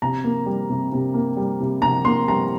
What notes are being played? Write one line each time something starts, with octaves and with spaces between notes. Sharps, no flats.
C3 A#5
A#3
G3
C3
C3
A#3
G3
C3
C3 A#5
A#3 C6
G3 A#5